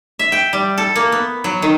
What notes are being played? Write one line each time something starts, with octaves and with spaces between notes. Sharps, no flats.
E5
G5
G3
A4
A#3
B3
F#3
D#3